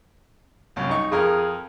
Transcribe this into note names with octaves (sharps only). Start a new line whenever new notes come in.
C2 F#2
D#4 C#6
F2 G#4 A#4